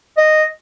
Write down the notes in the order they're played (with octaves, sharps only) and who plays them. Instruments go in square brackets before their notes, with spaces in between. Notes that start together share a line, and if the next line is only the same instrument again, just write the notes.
[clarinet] D#5